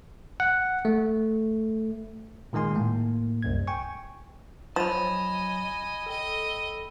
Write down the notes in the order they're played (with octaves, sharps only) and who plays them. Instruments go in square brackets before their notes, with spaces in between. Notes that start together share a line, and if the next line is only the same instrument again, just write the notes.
[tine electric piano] F#5
A3
A#2 D#3 G#3 G#5 C6
A2 A#3
C2 F#2 G#6
G5 G#5 C#6
[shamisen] F3 [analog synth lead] F#3 [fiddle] D#5 G#5 [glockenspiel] B5 E7
[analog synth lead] A4 [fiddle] D#5 G5